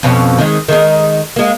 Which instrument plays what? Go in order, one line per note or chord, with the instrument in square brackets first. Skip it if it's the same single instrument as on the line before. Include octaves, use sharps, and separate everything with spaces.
[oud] F2 B2 C#4
D#3 G#3
D#3 G#3 D#4
G#3 A#3